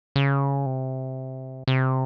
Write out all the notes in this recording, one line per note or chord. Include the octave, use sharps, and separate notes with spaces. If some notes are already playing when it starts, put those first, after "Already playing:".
C#3
C3
C3